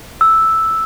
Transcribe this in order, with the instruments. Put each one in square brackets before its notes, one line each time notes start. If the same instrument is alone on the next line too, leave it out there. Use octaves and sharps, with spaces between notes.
[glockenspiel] E6